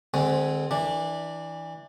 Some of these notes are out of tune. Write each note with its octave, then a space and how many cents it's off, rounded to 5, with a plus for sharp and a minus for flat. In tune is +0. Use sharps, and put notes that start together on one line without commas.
D3 +40 G#3 +0 C4 +0
E3 -20 D4 +0